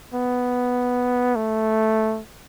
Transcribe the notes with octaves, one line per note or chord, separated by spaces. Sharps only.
B3
A3